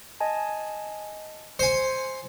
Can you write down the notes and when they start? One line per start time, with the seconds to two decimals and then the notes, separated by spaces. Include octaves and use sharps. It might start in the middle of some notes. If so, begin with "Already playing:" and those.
0.20 D#5 G#5 A5
1.59 C5 G#5 C#7